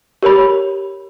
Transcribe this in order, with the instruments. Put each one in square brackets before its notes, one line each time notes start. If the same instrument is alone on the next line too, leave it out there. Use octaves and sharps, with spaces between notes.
[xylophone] G4 A#4 C#5 B5